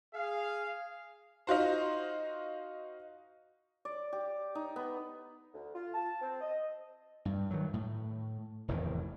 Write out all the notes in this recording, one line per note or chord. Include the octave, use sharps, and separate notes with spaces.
G#4 F5
D#4 F4 F#4 C5
D5
G4
D#4
B3
D2
F4
A5
C4
D#5
G2
D#3 F#3
A2
F1 E2 A2 D#3